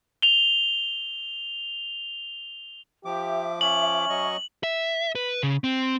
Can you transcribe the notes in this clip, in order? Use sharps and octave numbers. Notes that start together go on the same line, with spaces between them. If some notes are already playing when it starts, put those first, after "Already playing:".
F7 G7
F3 G4 E5 D6
C#4 F#7
F#3 D#5 C#6
E5
B4
C#3
C4